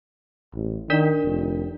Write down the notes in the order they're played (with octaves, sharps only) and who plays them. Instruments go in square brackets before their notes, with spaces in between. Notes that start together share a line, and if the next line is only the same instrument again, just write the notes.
[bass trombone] A1
[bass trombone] D#3 [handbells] D4 A#4 D5
[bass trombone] F1